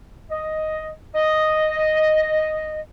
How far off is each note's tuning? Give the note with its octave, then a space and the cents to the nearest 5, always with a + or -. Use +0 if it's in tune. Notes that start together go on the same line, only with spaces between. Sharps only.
D#5 +5
D#5 -5